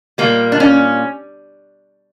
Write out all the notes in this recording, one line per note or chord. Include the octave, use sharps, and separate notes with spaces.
A#2 G3 A#3
D4
C#4